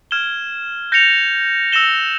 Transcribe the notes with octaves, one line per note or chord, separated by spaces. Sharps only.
F6 G#6 E7 G7
G6 A#6 C#7 F7
E6 A#6 E7 G7